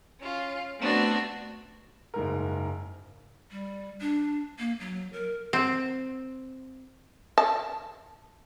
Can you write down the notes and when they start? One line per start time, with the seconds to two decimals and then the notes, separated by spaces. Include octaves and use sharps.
0.22 C#4 F4
0.78 A3 B3 C4 D4 F#4
2.14 F#1 G#2 A#4
3.51 G3
4.01 D4
4.59 A#3
4.80 F#3
5.13 A#4
5.53 C4
7.38 A5